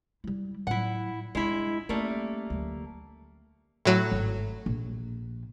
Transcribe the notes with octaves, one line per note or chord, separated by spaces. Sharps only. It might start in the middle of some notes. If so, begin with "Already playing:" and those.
G3 E4
A2 F#3 E4 F#5
G3 G#3 D4 E4
G3 A3 A#3 C#4
D2 F#3
A2 F#3
G#1
A#1